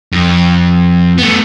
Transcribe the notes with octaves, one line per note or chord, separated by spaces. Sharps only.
F2
A3 B3